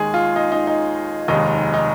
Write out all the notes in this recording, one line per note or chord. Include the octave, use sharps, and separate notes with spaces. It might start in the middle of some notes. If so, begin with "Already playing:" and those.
Already playing: D#2 D#3 G#3 G#4
F4
D#4
D#4
D#4
F1 D#2 D#3 G#3 D#4
D#4